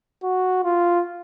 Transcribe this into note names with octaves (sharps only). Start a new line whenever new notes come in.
F#4
F4